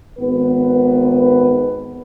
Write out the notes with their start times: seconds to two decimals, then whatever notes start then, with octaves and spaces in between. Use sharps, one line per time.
0.19 G#1 B3 B4